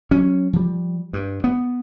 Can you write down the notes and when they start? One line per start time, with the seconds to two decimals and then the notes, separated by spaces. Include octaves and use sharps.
0.11 F#3 C#4
0.53 F3 G3
1.13 G2
1.44 B3